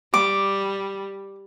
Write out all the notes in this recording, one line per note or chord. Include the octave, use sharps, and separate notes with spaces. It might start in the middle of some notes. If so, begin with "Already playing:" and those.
G3 D6